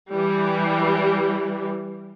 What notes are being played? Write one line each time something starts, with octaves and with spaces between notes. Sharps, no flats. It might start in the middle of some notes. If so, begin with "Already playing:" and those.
E3 G3